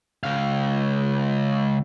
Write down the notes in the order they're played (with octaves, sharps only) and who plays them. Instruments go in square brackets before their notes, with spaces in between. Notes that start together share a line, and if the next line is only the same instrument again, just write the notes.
[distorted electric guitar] C#2 F5